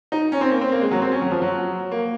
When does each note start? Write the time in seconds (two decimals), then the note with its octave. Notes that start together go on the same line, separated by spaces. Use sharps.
0.12 D#4
0.32 C#4
0.41 C4
0.51 A#3
0.61 C4
0.72 A#3
0.82 G#3
0.91 F#3
1.02 C4
1.12 C#4
1.22 F#3
1.31 F3
1.42 F#3
1.92 A#3